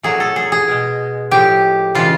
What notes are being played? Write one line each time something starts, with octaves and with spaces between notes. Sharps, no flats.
A#2 F#3 A3 G#4
A4
G#4
G#4
B2 G#3
A2 F3 G#3 G4
C#3 E3 G#3 F4